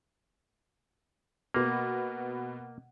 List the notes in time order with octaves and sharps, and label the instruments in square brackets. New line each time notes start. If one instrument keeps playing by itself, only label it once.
[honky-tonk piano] B2 B3 [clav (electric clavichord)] A#3